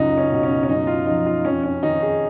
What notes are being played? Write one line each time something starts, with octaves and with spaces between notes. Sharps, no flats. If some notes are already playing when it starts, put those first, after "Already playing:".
Already playing: C#2 F#2 D#4
C#4
B2
C#4
C#4
F#2 D#4
F4
F3 D#4
F4
F2 C#4
C#4
D#3 D#4
G#4